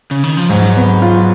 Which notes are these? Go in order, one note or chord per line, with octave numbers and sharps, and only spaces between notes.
C#3
D#3
F3
G#2 F#3
B3
F4